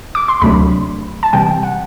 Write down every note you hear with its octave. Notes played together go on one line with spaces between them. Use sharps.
D6
C6
D2 C3 F#3 A3 D4 B5
A5
C3 E3 G3 G5
F#5